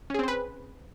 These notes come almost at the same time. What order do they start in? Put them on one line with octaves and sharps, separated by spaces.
C#4 G#4 C4 C5 B4